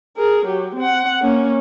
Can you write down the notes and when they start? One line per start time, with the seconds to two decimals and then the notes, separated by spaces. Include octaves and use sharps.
0.17 G#4 A#4
0.46 F#3 G4
0.76 C4 F#5
1.21 A#3 C#4